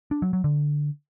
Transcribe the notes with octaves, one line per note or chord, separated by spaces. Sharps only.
D4
F#3
F#3
D3